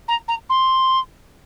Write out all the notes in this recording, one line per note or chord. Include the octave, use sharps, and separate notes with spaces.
A#5
A#5
C6